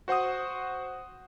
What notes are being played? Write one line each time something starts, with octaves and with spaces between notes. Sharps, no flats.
F#4 C5 F#5 C#6 D#6